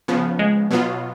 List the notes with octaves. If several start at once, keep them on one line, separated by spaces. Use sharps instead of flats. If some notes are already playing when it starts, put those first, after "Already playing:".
C#3 F3 B3
G#3
B2 F#3 B3 F4